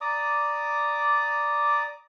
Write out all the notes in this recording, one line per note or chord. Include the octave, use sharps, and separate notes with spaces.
D5 A#5 D6 D#6